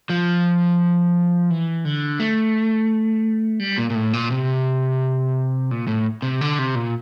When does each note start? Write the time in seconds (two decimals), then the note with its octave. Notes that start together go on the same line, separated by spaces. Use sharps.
0.10 F3
1.50 E3
1.85 D3
2.20 A3
3.60 G3
3.78 A#2
3.90 A#2
3.95 A2
4.13 A#2
4.31 C3
5.71 A#2
5.87 A2
6.22 C3
6.41 D3
6.59 C3
6.75 A#2